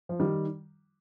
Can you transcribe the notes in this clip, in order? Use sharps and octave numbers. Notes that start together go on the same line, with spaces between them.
F3
D#3 G3